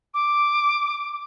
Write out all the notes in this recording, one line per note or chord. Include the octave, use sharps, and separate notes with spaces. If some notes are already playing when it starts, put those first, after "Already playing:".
D6